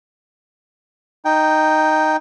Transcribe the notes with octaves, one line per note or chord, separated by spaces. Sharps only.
D#4 G5